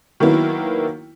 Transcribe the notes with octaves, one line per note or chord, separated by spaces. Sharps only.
D#3 F#3 A#3 B3 E4